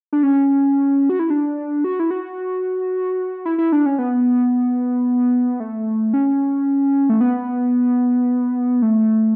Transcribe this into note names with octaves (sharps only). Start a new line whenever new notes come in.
D4
C#4
F#4
E4
D4
F#4
E4
F#4
E4
E4
D4
C#4
B3
A3
C#4
A3
B3
A3